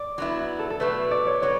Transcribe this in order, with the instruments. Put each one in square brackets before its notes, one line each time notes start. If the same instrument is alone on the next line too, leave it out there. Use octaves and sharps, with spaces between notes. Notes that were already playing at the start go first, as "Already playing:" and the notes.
Already playing: [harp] D5
[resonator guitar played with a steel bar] F#3 B3 E4
[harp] A4
A4
[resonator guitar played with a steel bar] B2 F#3 A3 [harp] B4
[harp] D5
C#5
[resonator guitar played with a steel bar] B2 F#3 [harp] C#5